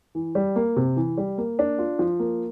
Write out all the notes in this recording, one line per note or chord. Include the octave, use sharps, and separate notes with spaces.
E3
G3
A#3
C3
E3
G3
A#3
D4
F4
F3
A#3